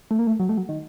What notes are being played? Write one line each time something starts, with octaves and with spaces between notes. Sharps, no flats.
A3
A#3
A3
F#3
A3
F#3
D#3